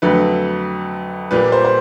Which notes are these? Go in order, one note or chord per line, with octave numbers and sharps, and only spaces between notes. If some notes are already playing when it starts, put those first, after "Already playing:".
F2 D3 F#3 A3 B4
A#2 G3 A#3 B4
C5
C5